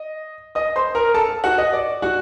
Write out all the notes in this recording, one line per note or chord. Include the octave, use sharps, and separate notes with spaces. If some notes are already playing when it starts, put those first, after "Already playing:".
Already playing: D#5
D#5 D#6
C5 C6
A#4 A#5
A4 A5
F#4 F#5
D#5
D5
F#4 F#5